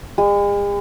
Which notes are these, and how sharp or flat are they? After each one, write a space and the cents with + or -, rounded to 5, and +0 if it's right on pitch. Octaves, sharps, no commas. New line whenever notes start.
G#3 -45